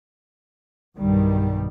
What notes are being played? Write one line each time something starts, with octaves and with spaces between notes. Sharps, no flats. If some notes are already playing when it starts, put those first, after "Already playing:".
B1 G2 B2 D#3 G3